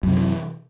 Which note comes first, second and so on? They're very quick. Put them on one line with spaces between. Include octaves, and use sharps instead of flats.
F#2 C3 D#3 E3